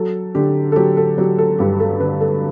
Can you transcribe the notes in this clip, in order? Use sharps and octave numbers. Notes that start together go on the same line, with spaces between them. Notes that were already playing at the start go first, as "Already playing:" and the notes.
Already playing: F#3 A4
D3 G4
A4
F#3 G4
A4
F#3 G4
A4
G2 G4
A4
D3 B4
A4